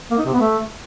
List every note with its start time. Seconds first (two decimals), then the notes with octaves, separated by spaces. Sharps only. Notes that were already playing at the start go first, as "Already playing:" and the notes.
0.11 A#3
0.18 D#4
0.26 C3
0.33 B3
0.40 A3